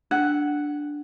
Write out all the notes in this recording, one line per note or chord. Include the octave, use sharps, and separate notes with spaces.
D4 F#5